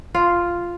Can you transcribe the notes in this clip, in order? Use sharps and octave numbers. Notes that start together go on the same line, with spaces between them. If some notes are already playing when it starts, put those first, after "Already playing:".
F4